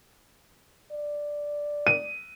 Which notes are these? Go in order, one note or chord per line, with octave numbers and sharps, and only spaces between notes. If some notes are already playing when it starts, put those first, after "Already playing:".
D5
D#7